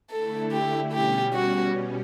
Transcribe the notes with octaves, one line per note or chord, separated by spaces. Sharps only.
D3 A3 E4 A4
G4
B2 G3 C#4 G4
F#4